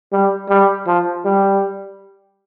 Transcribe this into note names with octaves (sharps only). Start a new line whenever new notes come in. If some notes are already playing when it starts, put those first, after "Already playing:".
G3
G3
F3
G3